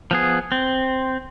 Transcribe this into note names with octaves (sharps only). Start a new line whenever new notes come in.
F3 B3 G#4
C4